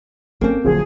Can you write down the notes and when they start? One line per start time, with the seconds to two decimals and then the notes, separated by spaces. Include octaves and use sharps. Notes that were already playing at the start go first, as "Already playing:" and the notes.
0.41 G#1 A#3 C4 C#4 A4
0.64 D1 A#1 D3 F3 F#3 G#4